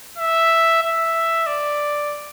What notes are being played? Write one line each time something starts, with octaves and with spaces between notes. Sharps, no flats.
E5
E5
D5